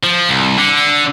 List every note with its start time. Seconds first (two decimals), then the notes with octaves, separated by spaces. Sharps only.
0.04 F3
0.29 C2
0.58 D3